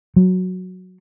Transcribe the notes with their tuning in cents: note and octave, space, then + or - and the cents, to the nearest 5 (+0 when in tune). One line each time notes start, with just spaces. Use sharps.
F#3 -5